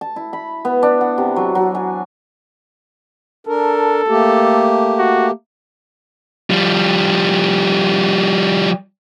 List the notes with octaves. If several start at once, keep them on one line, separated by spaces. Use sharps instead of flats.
A5
E4
B5
B3
D4
F#5
C3
F#3
F#3
G#5
D4 A4 A#4
A3 A#3 G4
F#4
F3 G3